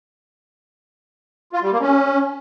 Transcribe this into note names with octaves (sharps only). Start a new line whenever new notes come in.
F4
G3
A#3
C#4